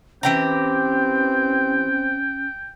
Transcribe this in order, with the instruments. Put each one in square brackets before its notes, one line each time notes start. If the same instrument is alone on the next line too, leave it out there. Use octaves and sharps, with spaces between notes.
[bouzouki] E3 G4 A#5 [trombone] C4 [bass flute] C#4 [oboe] G5